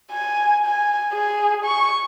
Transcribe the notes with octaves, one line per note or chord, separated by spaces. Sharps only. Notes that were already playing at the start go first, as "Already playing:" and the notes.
G#5
G#5
G#4
C#6